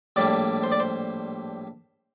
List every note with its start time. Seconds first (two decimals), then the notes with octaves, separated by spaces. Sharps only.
0.16 A#1 A2 G3 A#3 D5
0.63 C5
0.72 D5
0.80 C5